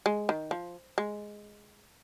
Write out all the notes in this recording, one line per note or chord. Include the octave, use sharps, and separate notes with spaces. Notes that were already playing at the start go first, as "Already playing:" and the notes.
G#3
D#3
F3
G#3